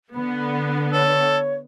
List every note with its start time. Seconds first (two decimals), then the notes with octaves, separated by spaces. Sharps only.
0.15 D3 B3 B5
0.92 A4 C#5